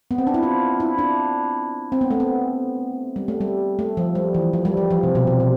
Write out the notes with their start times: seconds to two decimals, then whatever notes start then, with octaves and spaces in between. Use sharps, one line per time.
0.11 B3
0.18 C4
0.27 D4
0.34 E4
0.43 F4
0.80 E4
0.99 D4
1.92 C4
2.01 B3
2.11 A3
2.20 B3
3.16 G3
3.28 A3
3.41 G3
3.79 A3
3.97 F3
4.15 G3
4.35 E3
4.53 F3
4.65 G3
4.77 F3
4.90 F3
5.03 C3
5.15 B2
5.27 C3
5.40 B2